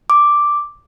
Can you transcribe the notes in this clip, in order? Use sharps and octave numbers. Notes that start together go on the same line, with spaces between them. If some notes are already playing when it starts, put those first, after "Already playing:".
D6